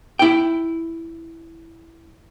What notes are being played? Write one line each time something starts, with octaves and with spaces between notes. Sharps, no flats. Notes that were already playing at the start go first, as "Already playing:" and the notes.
E4 G5